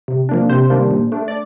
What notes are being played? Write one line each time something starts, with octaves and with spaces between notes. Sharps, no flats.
C3
F3 A#3 D4
C3 C5
D#3 G3 A#3 D4
A#2
A3 D4
D5